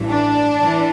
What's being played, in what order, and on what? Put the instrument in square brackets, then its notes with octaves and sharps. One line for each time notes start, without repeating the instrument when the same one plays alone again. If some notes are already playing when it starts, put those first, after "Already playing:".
Already playing: [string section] A1 G2 E3
D4
E3